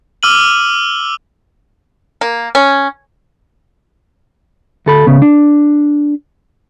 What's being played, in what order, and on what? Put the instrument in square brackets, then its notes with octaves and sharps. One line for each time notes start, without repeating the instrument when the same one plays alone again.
[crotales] D6 E6 F6 D#7 F#7
[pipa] A#3
C#4
[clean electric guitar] D2 A4 B5
C#2 C#3 B3
D4